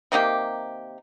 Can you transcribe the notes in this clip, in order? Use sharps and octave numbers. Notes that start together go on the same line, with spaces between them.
C3 D#3 A#3 G4